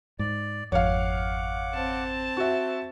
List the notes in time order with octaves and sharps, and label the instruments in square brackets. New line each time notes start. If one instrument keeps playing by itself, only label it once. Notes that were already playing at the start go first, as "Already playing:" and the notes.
[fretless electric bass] G#2 [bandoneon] D5
[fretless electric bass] G#1 F2 [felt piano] C#5 F5 [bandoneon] F#5 D6
[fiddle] C4 A5
[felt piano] F#4 E5